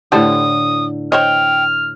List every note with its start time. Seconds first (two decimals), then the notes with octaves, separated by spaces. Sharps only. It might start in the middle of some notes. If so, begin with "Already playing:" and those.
0.12 A2 D3 G4 A4 C5 D#6
1.12 C5 C#5 D#5 G5 F6